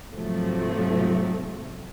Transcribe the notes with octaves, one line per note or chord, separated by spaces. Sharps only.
G#2 C3 F3 F#3 A3